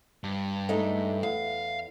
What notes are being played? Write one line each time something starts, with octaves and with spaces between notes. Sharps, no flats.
G2
G#3 A3 D#4
E2 F5